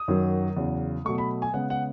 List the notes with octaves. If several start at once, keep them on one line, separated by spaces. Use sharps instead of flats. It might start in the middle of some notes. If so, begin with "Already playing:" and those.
Already playing: D#6
F#2 D#3 F#3
E2 C#3 F#3
B2 F#3 A3 C#6
B5
G#5
C#3 G#3 B3 F#5
F#5